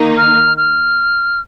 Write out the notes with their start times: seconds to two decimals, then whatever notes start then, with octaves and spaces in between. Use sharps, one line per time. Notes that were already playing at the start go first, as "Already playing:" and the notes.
Already playing: D#3 A#3 D#4
0.18 F6
0.57 F6